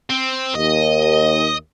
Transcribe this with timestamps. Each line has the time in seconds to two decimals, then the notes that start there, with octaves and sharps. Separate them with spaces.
0.10 C4
0.55 D#2 D#5